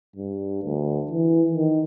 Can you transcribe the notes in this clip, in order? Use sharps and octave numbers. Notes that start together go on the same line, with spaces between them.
G2
D2
E3
D#3